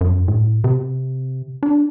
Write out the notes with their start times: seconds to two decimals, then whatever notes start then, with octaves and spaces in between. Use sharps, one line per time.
0.01 F#2
0.28 A2
0.64 C3
1.63 D4